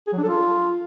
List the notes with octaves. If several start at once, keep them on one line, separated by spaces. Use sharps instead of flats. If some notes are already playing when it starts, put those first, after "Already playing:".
G#4
F#3
D4
A4
F4